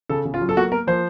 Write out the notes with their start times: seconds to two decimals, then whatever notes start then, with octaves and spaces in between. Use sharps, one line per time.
0.09 C#3 A4
0.25 C#3
0.34 F4
0.41 F#3
0.49 A4
0.56 A#3 F#4
0.72 A#3 A#4
0.87 F3 C5